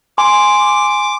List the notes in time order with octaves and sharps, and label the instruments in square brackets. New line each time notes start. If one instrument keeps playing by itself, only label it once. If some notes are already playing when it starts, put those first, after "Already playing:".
[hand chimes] G#5 C6 [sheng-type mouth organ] D6